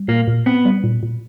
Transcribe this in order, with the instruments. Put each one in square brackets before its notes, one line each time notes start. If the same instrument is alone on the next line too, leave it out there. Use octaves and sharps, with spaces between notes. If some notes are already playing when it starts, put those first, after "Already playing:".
Already playing: [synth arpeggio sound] G3
[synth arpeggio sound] A#2 [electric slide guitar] A#3
[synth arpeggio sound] A#2
[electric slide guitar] B3 [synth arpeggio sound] C4
[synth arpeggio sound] G3
A#2
A#2